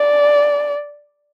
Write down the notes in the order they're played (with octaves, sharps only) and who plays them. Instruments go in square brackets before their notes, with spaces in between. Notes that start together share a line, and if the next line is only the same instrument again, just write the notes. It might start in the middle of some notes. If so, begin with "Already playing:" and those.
Already playing: [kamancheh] D5